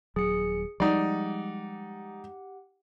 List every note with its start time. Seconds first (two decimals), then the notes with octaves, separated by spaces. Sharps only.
0.16 D#1 F#3 G#4 C#7
0.80 F3 G3 G#3 D#4 G4 D5 F#5